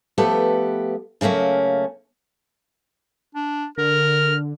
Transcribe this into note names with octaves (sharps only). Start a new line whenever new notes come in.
F3 A3 B3 G4 A4 B4
C#3 F#3 A3 A#3 C#4
D4
D3 A#4 F6